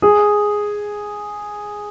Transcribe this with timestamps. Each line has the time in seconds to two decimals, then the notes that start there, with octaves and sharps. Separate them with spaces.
0.02 G#4